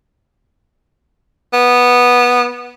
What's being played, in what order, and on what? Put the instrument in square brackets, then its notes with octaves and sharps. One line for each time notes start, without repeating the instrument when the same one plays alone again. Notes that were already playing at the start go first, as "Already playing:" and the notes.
[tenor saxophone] B3